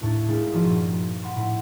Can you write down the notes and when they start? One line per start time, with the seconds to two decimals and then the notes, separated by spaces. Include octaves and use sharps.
0.01 D#2 A2 D4 C#5 A6
0.28 G#3 A#3 D4 E4 G4 A#4
0.52 G#1 F3 F4 F#4 D5 D#7
0.64 G2 A#2
1.22 F#5 B5 C6
1.36 A2 B5 C6